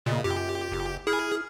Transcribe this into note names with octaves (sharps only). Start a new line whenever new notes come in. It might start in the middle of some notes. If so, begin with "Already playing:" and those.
A#2 C#3 D#5
F#2 F4 G4
F#1
E4 G#4 F6